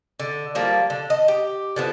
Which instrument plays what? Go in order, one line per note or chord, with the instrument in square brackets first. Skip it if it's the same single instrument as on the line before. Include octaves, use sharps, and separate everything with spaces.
[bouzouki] D3
F3 G3 A#3
D3
D#5
G4
D3 F3 B3